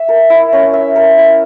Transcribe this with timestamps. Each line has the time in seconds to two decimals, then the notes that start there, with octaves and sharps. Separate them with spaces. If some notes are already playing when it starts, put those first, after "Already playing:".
Already playing: E5
0.09 A#4
0.30 E4
0.53 C#4
0.73 E5
0.96 A#4
1.18 E4